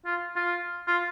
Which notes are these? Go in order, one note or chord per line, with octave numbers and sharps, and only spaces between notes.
F4
F4
F4